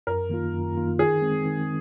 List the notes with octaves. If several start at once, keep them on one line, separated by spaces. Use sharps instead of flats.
F#2 A#4
D#3 A#3 F4
F#2
D#3 A#3 F4
D#3 G#4
G#3 C4
D#3